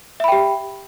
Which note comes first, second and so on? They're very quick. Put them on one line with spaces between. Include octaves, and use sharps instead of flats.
E5 B5 G5 G4